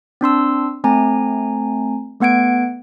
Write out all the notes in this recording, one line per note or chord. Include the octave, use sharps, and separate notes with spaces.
C4 D4 C6 E6
A3 C4 G#5 A#5
A3 B3 F#5 G#6 D7